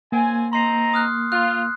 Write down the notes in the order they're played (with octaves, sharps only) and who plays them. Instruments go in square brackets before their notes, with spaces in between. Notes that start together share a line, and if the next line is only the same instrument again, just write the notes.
[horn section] F#2 C4 G#5 [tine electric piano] A#3
[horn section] C4 D#4 A#5 [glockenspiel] C6 C7
[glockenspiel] D#6 F6 F#6
[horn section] F4 [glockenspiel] F#6